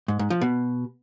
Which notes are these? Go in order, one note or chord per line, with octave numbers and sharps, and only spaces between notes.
G#2
G#2
F3
B2